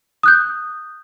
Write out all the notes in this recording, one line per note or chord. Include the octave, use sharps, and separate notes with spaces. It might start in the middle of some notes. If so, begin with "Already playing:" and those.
D#6 F#6 G6